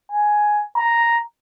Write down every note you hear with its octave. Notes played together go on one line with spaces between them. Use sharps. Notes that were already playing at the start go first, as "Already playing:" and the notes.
G#5
A#5